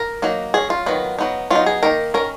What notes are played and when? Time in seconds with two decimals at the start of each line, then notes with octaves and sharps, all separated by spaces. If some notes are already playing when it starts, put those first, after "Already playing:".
Already playing: A#4
0.22 F#3 A#3 D#4
0.54 F#3 C#4 G#4
0.70 F4
0.86 D#3 F#3 B3
1.18 F#3 B3 D#4
1.50 F#3 B3 D#4 F4
1.66 G#4
1.82 D#3 A#3 D#4 A#4
2.14 D#3 A#3 C#4 A#4